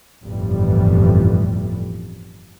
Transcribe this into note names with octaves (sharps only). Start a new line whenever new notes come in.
G1 F2 A2 E3 G3